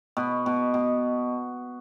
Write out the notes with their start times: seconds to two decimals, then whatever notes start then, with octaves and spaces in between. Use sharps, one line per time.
0.17 B2
0.46 B2
0.74 B2